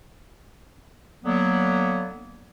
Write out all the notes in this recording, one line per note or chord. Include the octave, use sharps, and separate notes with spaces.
D3 F#3 A#3 B3